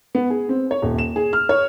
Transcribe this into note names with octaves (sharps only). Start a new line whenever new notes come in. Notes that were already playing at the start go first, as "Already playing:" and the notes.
B3
G#4
C4
C#5
D#1
E7
G#4
F6
C#5